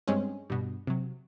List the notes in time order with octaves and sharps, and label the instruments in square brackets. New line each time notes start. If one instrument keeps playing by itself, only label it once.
[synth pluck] G2 G#3 C4 C#4
G2 B2
C3 F#3